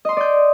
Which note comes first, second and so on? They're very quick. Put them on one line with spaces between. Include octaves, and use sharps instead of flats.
D#5 C6 D#6 D5 G6